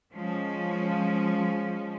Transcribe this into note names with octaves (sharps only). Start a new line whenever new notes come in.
F3 G#3 C#4